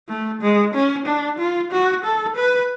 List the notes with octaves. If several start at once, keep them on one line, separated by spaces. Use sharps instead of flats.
A3
G#3
C#4
D4
F4
F#4
A4
B4